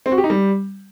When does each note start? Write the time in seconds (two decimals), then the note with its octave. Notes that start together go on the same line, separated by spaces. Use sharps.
0.06 C4
0.12 F#4
0.18 G4
0.24 D#4
0.30 G3